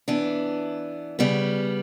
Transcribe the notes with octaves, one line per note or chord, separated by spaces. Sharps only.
E3 B3 D4
C#3 G3 B3